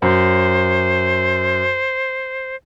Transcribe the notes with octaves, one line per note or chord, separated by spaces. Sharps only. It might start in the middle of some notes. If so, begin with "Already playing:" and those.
F#2 C5